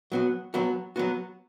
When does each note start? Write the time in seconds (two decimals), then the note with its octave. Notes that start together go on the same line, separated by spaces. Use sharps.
0.12 F#3 B3 F#4
0.54 F#3 B3 F#4
0.96 F#3 B3 F#4